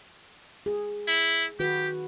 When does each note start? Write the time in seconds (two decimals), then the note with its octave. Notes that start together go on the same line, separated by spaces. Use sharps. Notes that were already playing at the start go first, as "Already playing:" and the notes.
0.66 G#4
1.08 E4
1.59 D#3 F#4 G4 B4